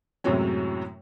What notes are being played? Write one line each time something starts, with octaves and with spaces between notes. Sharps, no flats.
F#2 A2 C3 F#3 G#3 C#4